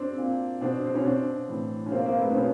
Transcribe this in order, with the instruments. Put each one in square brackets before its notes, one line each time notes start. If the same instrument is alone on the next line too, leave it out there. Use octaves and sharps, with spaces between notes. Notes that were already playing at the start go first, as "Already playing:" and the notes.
Already playing: [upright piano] C4 D4
A#2
B2 C4 D4
C4
C#4
B2 C4 D4
A2 E3
C#4
B2 A#3 C4
A#3 C4
A3 B3
C4
B2 B3 C#4